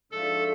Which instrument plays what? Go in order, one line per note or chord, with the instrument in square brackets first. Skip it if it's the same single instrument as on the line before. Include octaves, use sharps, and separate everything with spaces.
[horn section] G#2 F3 A3 D4 F4 [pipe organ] A4